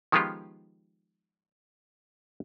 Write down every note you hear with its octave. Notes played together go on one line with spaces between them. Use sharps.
D#3 F3 G#3 B3 F4 G4